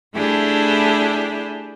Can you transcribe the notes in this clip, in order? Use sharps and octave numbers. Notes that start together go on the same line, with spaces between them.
A3 D4 E4 G4 G#4